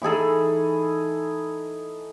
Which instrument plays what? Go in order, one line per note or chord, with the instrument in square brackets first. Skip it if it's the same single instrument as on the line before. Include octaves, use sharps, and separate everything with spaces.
[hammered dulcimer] E3 D#4 G#4 A4